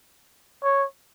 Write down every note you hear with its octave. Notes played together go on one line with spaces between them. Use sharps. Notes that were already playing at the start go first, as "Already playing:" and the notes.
C#5